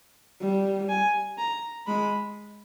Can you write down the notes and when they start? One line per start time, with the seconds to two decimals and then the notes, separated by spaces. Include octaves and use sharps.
0.41 G3
0.89 G#5
1.38 A#5
1.87 G#3 B5